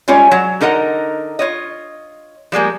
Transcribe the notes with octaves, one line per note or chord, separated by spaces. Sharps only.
G3 G#3 C#4 F4 C#5
F#3
D3 D#4 A#4 D#5 F#5
F4 C#5 D#5
F3 G3 G#3 A#3